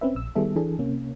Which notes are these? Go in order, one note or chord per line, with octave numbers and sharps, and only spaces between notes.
C4 C#4 B4 E5
A#1 E6
D#3 G3 B3 G#4 A4 E5
E3 D4 G#4 A4
C3 A#3 C#4